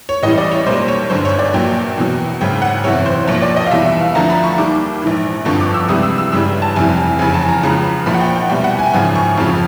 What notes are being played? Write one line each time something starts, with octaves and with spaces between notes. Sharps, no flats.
C#5
A1 A2 E3 G3 D#5
D5
C#5
B1 A#2 G3 C5
C#5
G1 F#2 D3 C5
C#5
D5
A#1 A#2 F#3 G5
E2 B2 F#3
G#1 F#2 C#3 G5
F#5
F#1 E2 C3 C#5
C5
B1 A#2 F3 C#5
D5
D#5
F5
E2 B2 G3 E5
E5
F5
D2 D3 F3 A#5
B5
C#6
D#2 D#3 G3 D6
A#1 G#2 E3
G1 F2 D3 F3 C#6
D6
E6
C#2 C3 E3 G3 D#6
E6
E6
G1 F#2 C#3 E3 G3 E6
A5
F1 F2 C3 E3 G3 G#5
F1 E2 C#3 G#5
A5
A#5
C#2 C#3 F3
A#1 A#2 F3 B5
F#5
G5
G5
C2 B2 G3 G5
F#5
G#5
G5
G#1 F#2 C#3 F3 G#5
C#6
F1 F2 C#3 F3